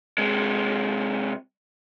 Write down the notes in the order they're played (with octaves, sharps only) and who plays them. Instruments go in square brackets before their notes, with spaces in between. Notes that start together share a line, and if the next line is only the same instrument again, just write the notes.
[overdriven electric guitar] C3 G#3